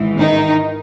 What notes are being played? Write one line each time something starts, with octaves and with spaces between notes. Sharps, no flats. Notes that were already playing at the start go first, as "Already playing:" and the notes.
Already playing: G#1 G#2 E3
D#3 D#4